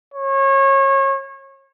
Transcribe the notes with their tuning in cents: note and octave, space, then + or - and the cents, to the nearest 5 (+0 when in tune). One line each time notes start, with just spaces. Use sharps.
C#5 -30